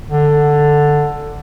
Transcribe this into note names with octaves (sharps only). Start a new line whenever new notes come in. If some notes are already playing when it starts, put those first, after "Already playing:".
D3